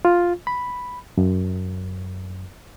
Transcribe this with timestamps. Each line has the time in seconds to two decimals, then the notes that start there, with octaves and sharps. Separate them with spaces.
0.05 F4
0.47 B5
1.18 F#2